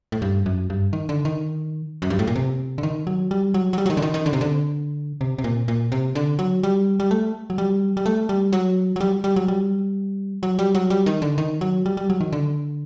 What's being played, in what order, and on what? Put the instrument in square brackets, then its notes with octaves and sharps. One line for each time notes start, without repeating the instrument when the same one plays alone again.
[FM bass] A2
G2
F#2
G2
D#3
D3
D#3
F#2
G2
A2
A#2
C3
D3
D#3
F#3
G3
F#3
F#3
G3
F#3
D#3
D3
D#3
D#3
D3
C3
D3
C3
C3
A#2
A#2
C3
D3
F#3
G3
G3
A3
F#3
G3
G3
A3
G3
F#3
F#3
G3
G3
F#3
G3
F#3
G3
F#3
G3
D#3
D3
D#3
F#3
G3
G3
F#3
D#3
D3